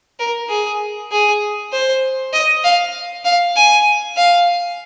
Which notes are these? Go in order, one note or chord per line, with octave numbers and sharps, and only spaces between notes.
A#4
G#4
G#4
C5
D#5
F5
F5
G#5
F5